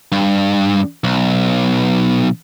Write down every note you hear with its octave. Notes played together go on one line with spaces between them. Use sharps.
G2
B1